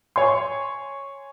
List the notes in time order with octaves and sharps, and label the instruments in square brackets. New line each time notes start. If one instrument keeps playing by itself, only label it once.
[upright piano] C#5 G#5 C6